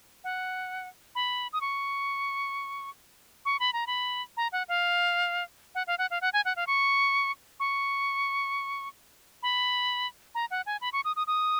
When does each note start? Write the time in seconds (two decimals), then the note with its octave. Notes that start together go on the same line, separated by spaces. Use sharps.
0.24 F#5
1.15 B5
1.53 D#6
1.61 C#6
3.45 C#6
3.60 B5
3.73 A#5
3.87 B5
4.37 A#5
4.52 F#5
4.68 F5
5.75 F#5
5.87 F5
5.98 F#5
6.10 F5
6.21 F#5
6.33 G#5
6.45 F#5
6.56 F5
6.67 C#6
7.60 C#6
9.43 B5
10.35 A#5
10.51 F#5
10.66 G#5
10.81 B5
10.93 C#6
11.05 D#6
11.16 D#6
11.27 D#6